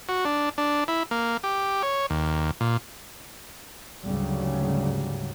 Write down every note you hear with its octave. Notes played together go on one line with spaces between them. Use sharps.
F#4
D4
D4
E4
A#3
G4
C#5
D#2
A#2
D2 G#2 C#3 F#3 G3